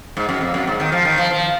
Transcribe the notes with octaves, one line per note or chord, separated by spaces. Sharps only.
G#2
F#2
F2
F#2
G#2
D#3
F3
D#3
F3
F3